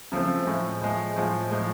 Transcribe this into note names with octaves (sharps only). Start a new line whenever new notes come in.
C#3 F3 A3 C4
A2 F3 G#3
A2 F3 G#3
A2 F3 G#3
A2 F3 G#3